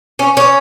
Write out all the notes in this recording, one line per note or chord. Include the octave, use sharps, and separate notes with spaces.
C#4
C#4